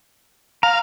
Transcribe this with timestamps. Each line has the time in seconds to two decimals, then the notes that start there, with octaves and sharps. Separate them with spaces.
0.63 F5 A#5